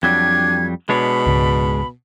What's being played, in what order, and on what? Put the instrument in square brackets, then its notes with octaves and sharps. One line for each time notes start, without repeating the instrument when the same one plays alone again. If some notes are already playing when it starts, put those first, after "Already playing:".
[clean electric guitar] F2 F#3 G3 [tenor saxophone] D4 [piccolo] G#6
[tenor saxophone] B2 [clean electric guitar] G#3 D4 C#5 [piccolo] B5
[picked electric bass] C#2 G#2